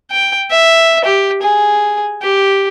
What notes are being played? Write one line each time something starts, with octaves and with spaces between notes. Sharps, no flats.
G5
E5
G4
G#4
G4